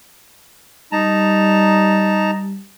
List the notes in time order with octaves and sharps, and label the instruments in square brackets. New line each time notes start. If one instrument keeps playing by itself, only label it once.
[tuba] G3 [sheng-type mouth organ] D#4 A5 A#5